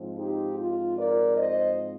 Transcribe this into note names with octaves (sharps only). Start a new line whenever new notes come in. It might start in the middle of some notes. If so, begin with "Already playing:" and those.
Already playing: G#2 F3 C4
D#4 G4
F4
A#4 D5
C5 D#5